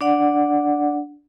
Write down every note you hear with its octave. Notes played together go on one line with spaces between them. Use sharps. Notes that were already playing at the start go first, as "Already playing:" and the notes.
D4 D5 F#5